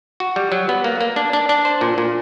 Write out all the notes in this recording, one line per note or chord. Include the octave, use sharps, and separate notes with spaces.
F#4
G3
F#3
B3
A#3
A#3
D4
D4
D4
C5
A#2
A#2